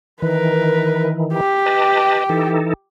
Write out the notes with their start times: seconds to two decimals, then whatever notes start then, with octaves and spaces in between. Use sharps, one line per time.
0.22 D#3 E3 A#4 B4
1.34 G4
1.66 B4 D#5 A5
2.29 E3 D#4 A4